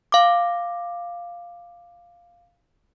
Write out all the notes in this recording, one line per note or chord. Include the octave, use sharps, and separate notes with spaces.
F5 D6